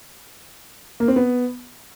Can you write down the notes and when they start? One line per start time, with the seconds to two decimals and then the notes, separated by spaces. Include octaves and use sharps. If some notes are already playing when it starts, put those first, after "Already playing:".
1.00 A#3
1.08 C4
1.16 B3